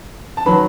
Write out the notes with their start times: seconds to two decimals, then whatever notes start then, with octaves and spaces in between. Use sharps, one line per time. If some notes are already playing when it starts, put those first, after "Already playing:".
0.37 A5
0.46 D#3 F#3 B4 B5